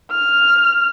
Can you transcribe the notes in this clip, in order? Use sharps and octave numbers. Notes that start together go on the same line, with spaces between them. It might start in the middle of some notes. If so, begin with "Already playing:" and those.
F6